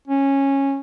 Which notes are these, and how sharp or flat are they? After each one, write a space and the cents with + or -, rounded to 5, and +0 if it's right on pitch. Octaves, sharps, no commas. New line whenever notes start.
C#4 -10